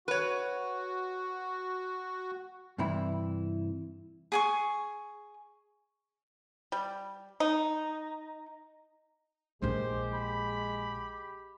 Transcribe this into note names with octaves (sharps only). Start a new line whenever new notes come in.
F#4 B4 C#5
G2 C3 E3 E4 B5
G#4 G#5 C#6
G3
D#4
A#1 G#3 E4 G4 C5
B5